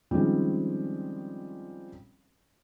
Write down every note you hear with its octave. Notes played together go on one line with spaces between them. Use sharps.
D#3 F3 G3 G#3 C4 C#4